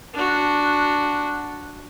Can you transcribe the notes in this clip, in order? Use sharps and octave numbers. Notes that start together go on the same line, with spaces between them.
D4 F#4